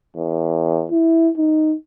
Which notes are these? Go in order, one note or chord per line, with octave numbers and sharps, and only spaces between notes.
E2
E4
D#4